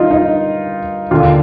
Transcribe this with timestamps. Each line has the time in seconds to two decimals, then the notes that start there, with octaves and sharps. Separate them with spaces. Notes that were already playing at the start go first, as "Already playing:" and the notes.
Already playing: G2 D#3 D#4 F4
0.10 D#4
1.11 D#2 D3 F4